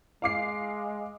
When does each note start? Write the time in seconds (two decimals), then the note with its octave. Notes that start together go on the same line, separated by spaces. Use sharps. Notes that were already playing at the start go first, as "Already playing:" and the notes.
0.22 G#3 F5 D6 C7